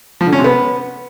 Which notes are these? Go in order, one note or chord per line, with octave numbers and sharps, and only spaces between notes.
F3
D3
C#4
C3
B3